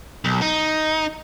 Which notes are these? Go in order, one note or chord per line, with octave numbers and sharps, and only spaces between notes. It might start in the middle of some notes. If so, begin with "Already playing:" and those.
B1
D#4